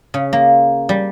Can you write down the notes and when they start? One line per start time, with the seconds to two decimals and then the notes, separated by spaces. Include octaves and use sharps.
0.14 C#3
0.33 A#3
0.89 G3